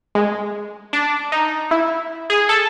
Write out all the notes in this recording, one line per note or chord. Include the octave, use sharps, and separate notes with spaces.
G#3
D4
D#4
E4
G#4
A4